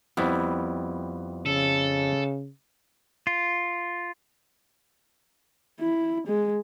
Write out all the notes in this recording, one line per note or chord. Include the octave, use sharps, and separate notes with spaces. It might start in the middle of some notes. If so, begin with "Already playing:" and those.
F2 G3 B3 E4
C#3 A4
F4
E4
G#3